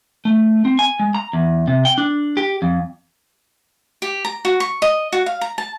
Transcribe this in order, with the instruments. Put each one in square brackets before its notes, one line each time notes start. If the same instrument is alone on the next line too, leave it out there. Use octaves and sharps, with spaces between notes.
[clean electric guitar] A3
C4
G#5
G#3
A#5
E2
C3
G5
D4
G4
F2
[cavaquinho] G4
A#5
F#4
C#6
D#5
F#4
F5
A#5
A5